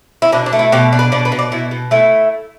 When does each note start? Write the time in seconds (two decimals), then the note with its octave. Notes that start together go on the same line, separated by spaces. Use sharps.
0.22 E4
0.33 B2 D4
0.46 D4
0.53 A3
0.59 E4
0.72 B2 G4
0.93 D4
0.99 B4
1.12 B2 D5
1.25 B4
1.32 B2
1.39 D5
1.52 B2 E4
1.71 B2
1.91 A3 E4